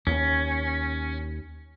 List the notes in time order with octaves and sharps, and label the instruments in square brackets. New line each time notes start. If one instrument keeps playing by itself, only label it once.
[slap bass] D#2 [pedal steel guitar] C#4